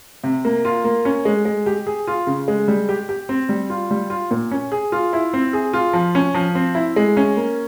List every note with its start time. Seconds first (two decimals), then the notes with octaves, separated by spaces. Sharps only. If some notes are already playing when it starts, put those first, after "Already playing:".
0.24 C3
0.45 A#3
0.65 F4
0.84 A#3
1.05 C#4
1.25 G#3
1.45 G#3
1.66 G4
1.87 G#4
2.07 F4
2.27 C#3
2.48 G#3
2.68 G3
2.89 G4
3.09 G4
3.29 C4
3.49 G3
3.70 F4
3.91 G3
4.10 F4
4.31 A#2
4.51 C#4
4.72 G#4
4.92 F4
5.13 E4
5.33 C4
5.53 G#4
5.73 F4
5.93 F3
6.15 C#4
6.34 F3
6.55 C4
6.75 E4
6.96 G#3
7.17 C#4
7.37 A#3